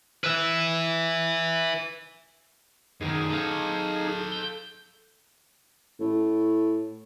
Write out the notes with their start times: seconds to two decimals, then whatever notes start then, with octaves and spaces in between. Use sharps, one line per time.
0.24 B4 E5
3.01 F#2 D#3 D#4 G#4
3.30 A4 F5
4.32 G6
6.00 A2